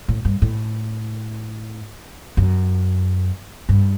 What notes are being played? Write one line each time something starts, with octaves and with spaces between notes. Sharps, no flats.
A2
G2
A2
F#2
G2